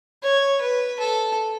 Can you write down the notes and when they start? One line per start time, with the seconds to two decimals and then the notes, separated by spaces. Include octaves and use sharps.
0.23 C#5
0.61 B4
1.00 A4